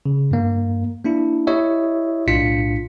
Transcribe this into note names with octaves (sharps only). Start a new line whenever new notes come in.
C#3
G2 A#3
A#3 D4 E4
E4 G4 C#5 D#5 E5
B1 A2 D4 F4 B6 C#7